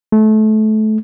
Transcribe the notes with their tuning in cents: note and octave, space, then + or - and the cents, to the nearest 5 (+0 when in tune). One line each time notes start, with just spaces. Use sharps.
A3 -25